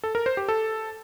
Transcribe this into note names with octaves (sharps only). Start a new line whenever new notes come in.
A4
A#4
C5
G4
A4